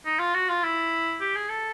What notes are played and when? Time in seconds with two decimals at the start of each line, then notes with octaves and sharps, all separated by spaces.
0.05 D#4
0.19 F4
0.34 F#4
0.49 F4
0.63 E4
1.21 G4
1.35 G#4
1.50 A4